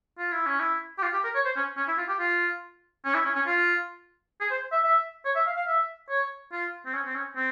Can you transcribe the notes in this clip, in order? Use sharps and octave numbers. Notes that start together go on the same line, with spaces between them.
F4
E4
C#4
E4
G4
F4
G4
A#4
C#5
C5
C#4
C#4
E4
F4
G4
F4
C#4
E4
C#4
C#4
F4
G#4
C5
E5
E5
C#5
E5
F5
F5
E5
C#5
F4
C4
C#4
C4
C#4
C4